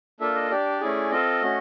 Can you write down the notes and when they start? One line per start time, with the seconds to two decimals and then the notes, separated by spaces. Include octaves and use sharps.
0.20 A#3 D4 F4 A4 E5
0.35 D#5
0.50 D4 G4 D5
0.81 A3 C#4 E4 G#4
1.11 C4 F4 A4 D#5
1.42 A3 C#4 F#4